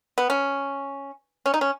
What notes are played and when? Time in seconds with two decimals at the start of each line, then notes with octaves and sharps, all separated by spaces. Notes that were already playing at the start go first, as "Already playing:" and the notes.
0.18 B3
0.30 C#4
1.46 C#4
1.54 D#4
1.61 C#4